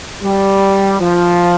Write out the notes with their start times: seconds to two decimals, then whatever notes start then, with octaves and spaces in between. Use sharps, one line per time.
0.23 G3
1.00 F3